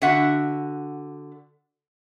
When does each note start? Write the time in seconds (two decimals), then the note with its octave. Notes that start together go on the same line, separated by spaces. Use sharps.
0.02 D3 F#4 E5 F#5